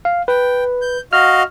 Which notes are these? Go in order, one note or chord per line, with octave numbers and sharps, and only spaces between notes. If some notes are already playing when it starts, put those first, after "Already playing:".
F5
B4 G5
G6
F#4 D#5 F5 F6